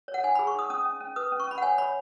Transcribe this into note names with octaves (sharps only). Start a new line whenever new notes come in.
C#5
F#5
D#4 G#5
B5
G#4
C#6
D#4 D#6
C#4 D#6
C#4
C#4
B4 D#6
C#4
C#6
C#4 B5
F#5
C#5 G#5
C#5 B5